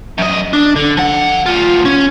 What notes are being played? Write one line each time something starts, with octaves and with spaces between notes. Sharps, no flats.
F#2 D#5
D4
D3
F3 F#5
D2 F4
C#4